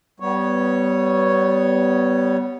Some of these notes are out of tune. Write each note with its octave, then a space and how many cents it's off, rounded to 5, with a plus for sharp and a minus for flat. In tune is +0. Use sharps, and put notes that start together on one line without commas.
G3 -25 B3 +5 C#5 +0